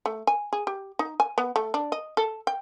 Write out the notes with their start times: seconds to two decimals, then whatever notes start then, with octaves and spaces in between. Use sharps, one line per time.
0.06 A3
0.27 G#5
0.53 G#4
0.67 G4
0.99 D#4
1.20 G#5
1.38 B3
1.56 A3
1.74 D4
1.92 D#5
2.17 A4
2.47 G5